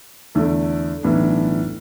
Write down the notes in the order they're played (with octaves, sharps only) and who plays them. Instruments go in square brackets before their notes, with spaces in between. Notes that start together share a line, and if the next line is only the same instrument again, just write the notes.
[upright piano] E2 D3 A3
B1 A2 E3 B3 D4